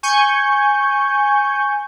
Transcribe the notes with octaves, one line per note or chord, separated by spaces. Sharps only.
G#5 C#6 G6